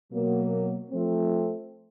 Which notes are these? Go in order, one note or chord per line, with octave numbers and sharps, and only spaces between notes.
B2 F#3 A#3
F3 A3 C4